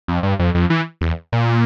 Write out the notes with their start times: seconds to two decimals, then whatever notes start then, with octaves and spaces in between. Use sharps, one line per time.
0.08 F2
0.23 G2
0.39 F2
0.55 F2
0.70 E3
1.01 E2
1.32 A#2